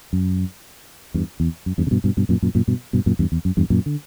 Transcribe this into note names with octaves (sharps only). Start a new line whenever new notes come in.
F#2
E2 G2
E2
F#2
E2 G2
C#3
G2 B2
G2 B2
G2 B2
F#2 A#2
F#2 A#2
F#2 A#2
G2 B2
G2 B2
F#2 A#2
E2 G2
E2
F#2
E2 G2
F#2 A#2
D3